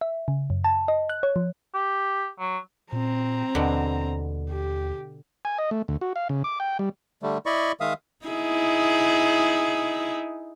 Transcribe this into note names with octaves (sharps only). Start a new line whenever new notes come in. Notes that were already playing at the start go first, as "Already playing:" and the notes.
E5
C#3
F#2
A5
D#5
F#6
C#5
F3
G4
F#3
A#2 C4 A#5
D#2 B2 D3
G4
G#5
D#5
A3
D2
F#4
F5
C#3
D6
G5
G3
D3 G3 A3
E4 D5 D#5 B5 C#6
D#3 G#3 E5 F5 D#6
D#4 E4 G#4